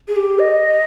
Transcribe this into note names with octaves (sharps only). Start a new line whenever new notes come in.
G#4
G4
D#5